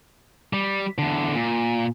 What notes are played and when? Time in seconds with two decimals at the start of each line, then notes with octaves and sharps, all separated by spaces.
0.53 G3
0.98 E2 D3
1.35 A#2